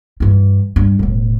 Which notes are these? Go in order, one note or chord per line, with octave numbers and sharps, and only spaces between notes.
G2 E3
G2
E1 A2